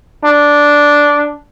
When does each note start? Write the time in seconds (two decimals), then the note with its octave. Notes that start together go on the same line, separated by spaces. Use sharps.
0.24 D4